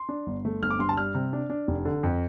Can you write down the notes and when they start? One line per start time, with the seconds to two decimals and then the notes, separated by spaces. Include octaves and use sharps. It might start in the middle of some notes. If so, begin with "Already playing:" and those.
Already playing: C6
0.09 D4
0.27 G1
0.45 A3
0.62 G1 F6
0.70 D6
0.79 G2 C6
0.89 A5
0.97 G3 F6
1.14 C3
1.33 D4
1.50 D4
1.68 F1
1.85 D3
2.03 F2